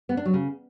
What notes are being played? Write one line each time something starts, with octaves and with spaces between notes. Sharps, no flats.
B3
D4
F#3
C#3